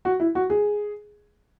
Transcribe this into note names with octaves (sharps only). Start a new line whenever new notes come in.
F#4
E4
F#4
G#4